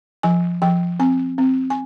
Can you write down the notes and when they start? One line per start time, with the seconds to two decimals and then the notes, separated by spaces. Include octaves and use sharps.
0.23 F3 G#5
0.62 F3 G5
1.00 C4 G#5
1.38 C4
1.70 G#5